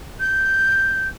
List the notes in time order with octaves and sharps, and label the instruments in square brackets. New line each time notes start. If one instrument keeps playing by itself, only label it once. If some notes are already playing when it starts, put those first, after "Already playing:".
[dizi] G6